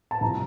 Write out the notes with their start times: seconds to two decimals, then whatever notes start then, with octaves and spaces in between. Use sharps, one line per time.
0.11 A5
0.21 C2 C3 F3 A#5